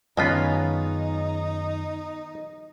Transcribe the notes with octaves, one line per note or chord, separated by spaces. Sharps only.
F#2 D#3 G#3 B3 C#4 D#4 F4 B5